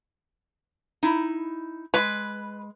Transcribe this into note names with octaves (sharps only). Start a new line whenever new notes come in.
D#4 E4
G#3 B4